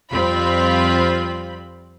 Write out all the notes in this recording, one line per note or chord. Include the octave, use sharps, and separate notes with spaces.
F2 G3 C4 F4 B5